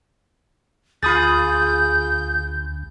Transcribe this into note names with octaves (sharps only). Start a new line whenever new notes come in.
D2 F4 G#4 B5 D#6 G6 A6